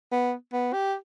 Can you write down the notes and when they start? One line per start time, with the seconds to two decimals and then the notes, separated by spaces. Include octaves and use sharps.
0.12 B3
0.53 B3
0.73 G4